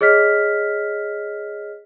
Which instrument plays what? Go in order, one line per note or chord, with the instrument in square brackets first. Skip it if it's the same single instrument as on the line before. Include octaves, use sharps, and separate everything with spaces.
[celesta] G#4 C#5 D#5 F6 B6